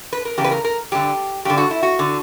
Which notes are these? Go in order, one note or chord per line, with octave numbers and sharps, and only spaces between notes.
B4
A#4
E2 C#3 G4
B4
A#4
A#4
G2 D3 G4
G2 D3 G4
F#4
E4
F#4
D3